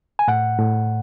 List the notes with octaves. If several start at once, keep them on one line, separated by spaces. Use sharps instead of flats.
G#5
A2 F#5
A2